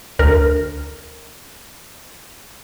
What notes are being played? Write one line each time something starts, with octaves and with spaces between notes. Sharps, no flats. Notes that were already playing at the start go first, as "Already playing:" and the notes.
D2 A#4